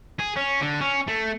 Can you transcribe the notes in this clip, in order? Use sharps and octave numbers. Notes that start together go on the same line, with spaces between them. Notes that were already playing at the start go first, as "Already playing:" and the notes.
G#4
C#4
D3
C#4
A3